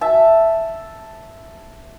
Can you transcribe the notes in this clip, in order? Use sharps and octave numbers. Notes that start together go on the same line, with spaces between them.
E5 A5